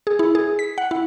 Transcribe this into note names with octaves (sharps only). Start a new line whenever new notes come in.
G#4
E4
G#4
B6
F#5
E4